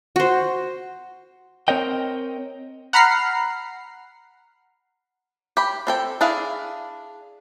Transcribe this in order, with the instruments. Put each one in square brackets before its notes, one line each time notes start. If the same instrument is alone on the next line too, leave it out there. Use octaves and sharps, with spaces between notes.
[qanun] F#4 C5
[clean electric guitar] C4 A#4 C#5 D#5 G5
[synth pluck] F#5 A#5 B5 F6 C7
[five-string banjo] G4 B5
C4 A4 G5
D4 E4 G#4 F5